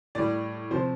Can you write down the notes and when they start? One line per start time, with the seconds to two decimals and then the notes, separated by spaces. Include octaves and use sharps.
0.15 A2 G3 D5
0.71 C3 F3 C5